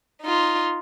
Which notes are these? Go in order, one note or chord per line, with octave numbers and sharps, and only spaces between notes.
D#4 F4